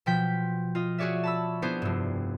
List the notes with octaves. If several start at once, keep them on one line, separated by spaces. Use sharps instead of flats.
B2 F3 G5 B6
F4 D#5
F#4 G#4 C#5 D5 E5
A5 B5 E6
B3 C4 D4 E4 G#4 C5
F1 G2